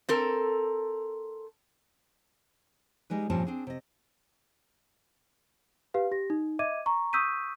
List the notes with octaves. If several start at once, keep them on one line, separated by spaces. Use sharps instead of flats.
C4 A4 A#4
G3 G#3 D#4 B4
G2 A#2 F3 C4 C#4 A5
C4 D4 G#4
C3 D#5
G4 B4 F5
G4 A#6
D#4
D#5 E5 D6 G#6 D#7
A#5 C#6
C#6 D#6 E6 G6 B6 D#7